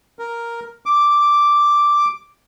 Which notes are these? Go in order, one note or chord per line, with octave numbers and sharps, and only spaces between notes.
A#4
D6